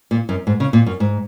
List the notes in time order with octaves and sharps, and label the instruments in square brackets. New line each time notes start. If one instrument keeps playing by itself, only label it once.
[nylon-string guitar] A#2
F#2
G#2
C#3
A#2
F#2
G#2